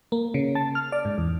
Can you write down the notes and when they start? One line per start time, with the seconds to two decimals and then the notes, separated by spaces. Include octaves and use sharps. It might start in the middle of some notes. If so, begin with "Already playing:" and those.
0.12 A#3
0.34 C#3
0.55 A5
0.75 F6
0.92 D5
1.05 G#2
1.18 E2